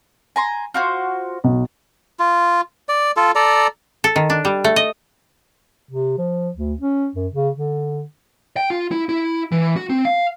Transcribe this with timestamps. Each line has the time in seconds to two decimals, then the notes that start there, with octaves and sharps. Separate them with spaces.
0.36 G#5 A#5 C6
0.74 F4 F#4 C5
1.44 B1
2.19 F4
2.89 D5
3.17 F4 A4
3.35 A4 D5 A#5
4.04 A4
4.16 D#3
4.30 D4
4.45 G3
4.64 A3
4.76 D#5
5.91 C3
6.18 F3
6.56 D2
6.81 C#4
7.15 F#2
7.34 C#3
7.56 D3
8.57 G5
8.70 F4
8.91 E4
9.09 E4
9.52 E3
9.76 F#4
9.90 C4
10.05 F5